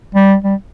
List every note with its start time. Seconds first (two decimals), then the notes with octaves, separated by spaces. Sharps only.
0.15 G3
0.44 G3